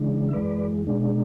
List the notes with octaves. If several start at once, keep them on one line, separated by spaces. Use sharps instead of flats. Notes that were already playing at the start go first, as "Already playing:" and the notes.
Already playing: C#3 E3 G#3 D4
E5
F#2 E3 G#3 B4 D5
B2 G#3 D4